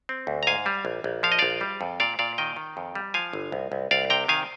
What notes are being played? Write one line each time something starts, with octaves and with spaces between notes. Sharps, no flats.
C4
D2
A#5
G#2 F5 G#5
G3
A#1
A#1
F3 F5
D#5
A#1 D5 F5
G3
F2
A#2 D5 F5
A#2 D5 F5
D#3 D#5 G5
D#3
F2
G3
F3 F5 G#5
G1
C2
C2
C2 D5 F5
C3 G5 A#5
D#3 F5 G#5